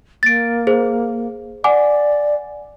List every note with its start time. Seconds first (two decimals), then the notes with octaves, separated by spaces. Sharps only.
0.23 A#3 A6 D7
0.67 G#4 C5
1.64 D5 F#5 G#5 D6